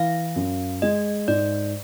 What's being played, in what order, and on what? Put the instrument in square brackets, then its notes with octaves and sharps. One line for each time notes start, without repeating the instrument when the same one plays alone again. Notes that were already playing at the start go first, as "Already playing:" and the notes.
Already playing: [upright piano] E3 [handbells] F5
[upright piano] F#2
[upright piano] G#3 [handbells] D#5
[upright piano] G#2 [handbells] D5